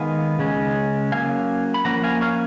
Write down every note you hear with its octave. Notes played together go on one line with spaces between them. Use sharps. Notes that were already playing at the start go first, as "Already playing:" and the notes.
Already playing: D#3 G#3 B3 F5 G#5
C#3 G#3 C#4
F#3 A#3 C#4 F5 G#5
B5
F3 A#3 C#4 F#5 A#5
F5 G#5
C#5 F5